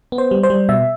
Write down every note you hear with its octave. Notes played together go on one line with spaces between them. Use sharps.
B3
C5
G3
C5
G3
B2 E5